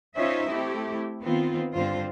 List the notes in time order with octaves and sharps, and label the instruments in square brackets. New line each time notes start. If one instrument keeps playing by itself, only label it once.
[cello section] C#4 D#4 F4 C5 D#5 E5
A3 C4 E4 G4
D#3 B3 C4 F4
G2 D3 C4 F4 C5